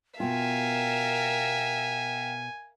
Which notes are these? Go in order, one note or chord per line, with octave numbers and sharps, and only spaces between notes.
B2 F4 A#4 E5 F5 G5 G#5